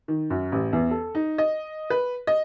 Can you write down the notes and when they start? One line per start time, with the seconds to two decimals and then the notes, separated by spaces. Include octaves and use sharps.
0.08 D#3
0.30 F#2
0.52 A1
0.73 E2
0.91 A4
1.15 D#4
1.38 D#5
1.90 B4
2.27 D#5